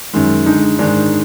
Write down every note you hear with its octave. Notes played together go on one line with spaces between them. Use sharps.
F#2 D#3 G#3
D3 G#3 D#4
G#2 D#3 G#3 D4